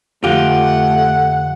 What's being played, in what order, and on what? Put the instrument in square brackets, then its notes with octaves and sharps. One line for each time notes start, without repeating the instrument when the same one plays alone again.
[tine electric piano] F2 D3 F3 [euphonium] A3 [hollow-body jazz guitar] F4 G4 [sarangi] F#5